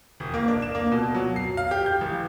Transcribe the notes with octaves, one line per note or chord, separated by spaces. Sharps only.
E1
A#3
D4
E7
A#3
B2
F#3
C7
F5
G4
G6
A1